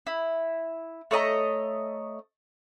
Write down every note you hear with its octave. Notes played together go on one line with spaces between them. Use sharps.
E4
A3 C#5 D#5 A#5